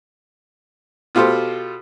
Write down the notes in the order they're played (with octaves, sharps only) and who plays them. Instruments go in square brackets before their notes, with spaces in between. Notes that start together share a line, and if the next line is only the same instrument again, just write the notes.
[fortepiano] B2 F4 G4 A4 C5